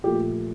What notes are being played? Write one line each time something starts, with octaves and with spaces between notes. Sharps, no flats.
A#2 F3 A3 G4